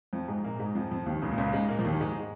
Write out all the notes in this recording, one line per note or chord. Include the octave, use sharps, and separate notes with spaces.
F2 F3
G#2 G#3
A#2 A#3
G#2 G#3
F2 F3
F2 F3
D#2 D#3
C#2 C#3
A#2
C#2 C#3
G#2 G#3
A#2 A#3
F3
D#2 D#3
G#2 G#3